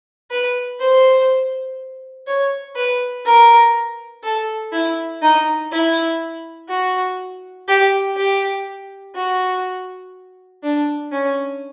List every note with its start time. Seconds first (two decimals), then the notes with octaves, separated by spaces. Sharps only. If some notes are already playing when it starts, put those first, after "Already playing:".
0.31 B4
0.79 C5
2.27 C#5
2.76 B4
3.25 A#4
4.23 A4
4.72 E4
5.22 D#4
5.72 E4
6.69 F#4
7.68 G4
8.17 G4
9.15 F#4
10.63 D4
11.12 C#4